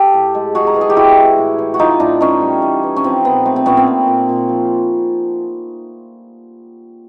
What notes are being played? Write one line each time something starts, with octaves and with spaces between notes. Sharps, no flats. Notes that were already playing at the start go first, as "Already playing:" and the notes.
Already playing: G4 A4
A2
G#3
G#3 F#4 G#4
A#4
E3 A4
G#4
G4
G#3 E4 F#4
G#3
A2
E3
F#4
A2 D#4 F4
A2 D4 E4
E3 C#4 D#4
G3
E3
E3
C#4
F3 C4
A#2 B3
A3 C4
C4
A#2 B3 C#4
C4
A#2
A#2
A#2
F3